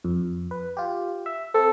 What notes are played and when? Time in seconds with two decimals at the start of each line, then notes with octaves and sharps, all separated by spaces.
0.04 F2
0.51 B4
0.77 F4 G4
1.26 E5
1.54 C4 A4